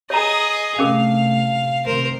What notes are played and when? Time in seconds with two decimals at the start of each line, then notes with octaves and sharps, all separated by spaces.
0.10 G#4 C#5 D#5 A#5
0.79 C3 A3 C#4 G#4 A#4 F5
1.86 C3 D#3 A3 A#4 C5